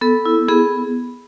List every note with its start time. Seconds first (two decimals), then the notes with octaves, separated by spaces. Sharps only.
0.01 B3 A4
0.26 E4
0.48 B3 G#4